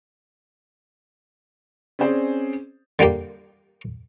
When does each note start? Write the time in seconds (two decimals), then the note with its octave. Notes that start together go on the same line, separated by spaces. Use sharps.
1.99 C4 C#4 G#4 C5 D5
2.99 D3 G3 A#3 G4